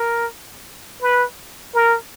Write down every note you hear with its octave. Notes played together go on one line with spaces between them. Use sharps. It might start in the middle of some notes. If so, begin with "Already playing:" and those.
Already playing: A#4
B4
A#4